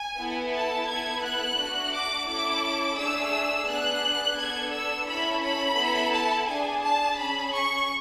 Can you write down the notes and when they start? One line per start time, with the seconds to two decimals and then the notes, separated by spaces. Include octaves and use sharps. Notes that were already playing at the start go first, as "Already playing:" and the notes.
Already playing: G#5
0.17 B3 E4 A4
0.53 A5
0.87 B3 E4 A4 G#6
1.23 F#6
1.57 A3 D4 F#4
1.92 D6
2.27 C#4 E4 A4 D6
2.97 A3 D4 G#4 E6
3.67 B3 D4 G#4 F#6
4.37 B3 D4 A4 G#6
4.72 E6
5.07 C#4 E4 A4 B5
5.42 B5
5.77 B3 E4 A4
6.12 A5
6.47 D4 G#4 G#5
6.82 A5
7.18 C#4 G#4 B5
7.52 C#6